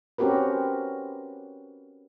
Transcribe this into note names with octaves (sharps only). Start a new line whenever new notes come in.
C4 C#4 F#4 G4 A#4 B4